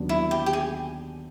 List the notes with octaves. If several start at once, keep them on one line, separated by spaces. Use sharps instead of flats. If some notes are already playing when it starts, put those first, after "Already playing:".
Already playing: D#2 D3 F#3 B3 D4
E4
G4
G4
G#4